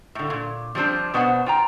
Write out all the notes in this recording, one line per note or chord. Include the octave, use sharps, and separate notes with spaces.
A2 D3
A#2
F3 G3 C4 D4
B2 B3 D4 C5 F#5
F4 G5 A#5